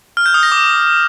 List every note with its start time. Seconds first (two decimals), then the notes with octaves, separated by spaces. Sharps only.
0.17 F6
0.26 G6
0.34 D#6
0.43 A#6
0.52 D6